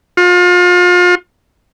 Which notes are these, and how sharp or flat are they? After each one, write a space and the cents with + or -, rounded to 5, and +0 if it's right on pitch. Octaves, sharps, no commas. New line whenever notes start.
F4 +35